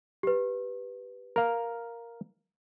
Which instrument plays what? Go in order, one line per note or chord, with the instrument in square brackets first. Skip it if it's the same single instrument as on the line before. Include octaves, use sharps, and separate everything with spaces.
[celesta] G4 B4
[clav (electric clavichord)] A#4 F5